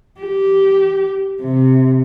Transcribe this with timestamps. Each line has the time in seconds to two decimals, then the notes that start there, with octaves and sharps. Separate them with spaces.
0.21 G4
1.42 C3